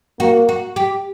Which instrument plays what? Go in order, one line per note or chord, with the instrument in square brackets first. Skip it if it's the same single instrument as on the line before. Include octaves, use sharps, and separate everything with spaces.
[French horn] A#3 [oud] F#4
[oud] F#4
G4